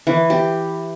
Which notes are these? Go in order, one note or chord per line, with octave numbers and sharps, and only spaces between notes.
E3
G4